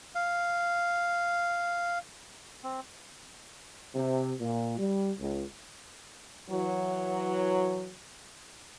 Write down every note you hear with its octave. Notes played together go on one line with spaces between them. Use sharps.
F5
C4
C3
A#2
G3
C#2
E3 F#3